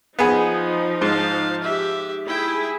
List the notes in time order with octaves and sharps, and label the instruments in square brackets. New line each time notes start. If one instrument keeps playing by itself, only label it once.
[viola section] F3 D#4 [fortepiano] B3 G#4
[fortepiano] G#2 [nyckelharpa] F5 A5
[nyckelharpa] G4 E5
[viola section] E4 G#4 [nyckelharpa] G5